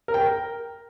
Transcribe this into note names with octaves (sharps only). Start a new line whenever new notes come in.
A#4
G5
A#4